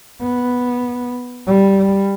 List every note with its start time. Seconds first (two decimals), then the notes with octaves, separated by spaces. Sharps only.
0.21 B3
1.47 G3